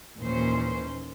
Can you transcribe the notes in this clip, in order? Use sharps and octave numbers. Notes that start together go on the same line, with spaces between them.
D#2 A#2 E3 C#4 C5